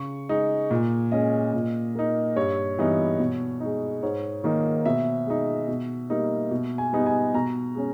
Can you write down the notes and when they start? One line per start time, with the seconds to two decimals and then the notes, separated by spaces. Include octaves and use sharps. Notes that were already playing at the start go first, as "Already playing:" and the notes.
Already playing: C#3 C#6
0.29 G#3 D#4
0.71 A#2
1.12 G#3 C#4 D#5
1.53 A#2
1.95 A#3 D#4
2.36 G2 C#5
2.79 E3 G3 B3 D#4
3.19 B2
3.60 G#3 D#4
4.03 G#2 C#5
4.44 D#3 A#3 D#4
4.86 B2 E5
5.27 G#3 D#4
5.68 B2
6.10 G3 A#3 D#4
6.51 B2
6.78 G#5
6.93 G3 B3 D#4
7.06 G#5
7.34 B2 A#5
7.75 G#3 C#4